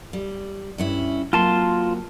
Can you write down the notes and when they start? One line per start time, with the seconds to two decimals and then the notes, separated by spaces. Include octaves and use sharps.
0.13 G3
0.78 G2 C#4 E4
1.33 F#3 A#3 C4 F4 A5 C6